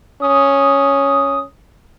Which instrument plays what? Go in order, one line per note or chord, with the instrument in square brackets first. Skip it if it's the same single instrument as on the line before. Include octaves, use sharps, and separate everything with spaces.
[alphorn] C#4 [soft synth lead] D#6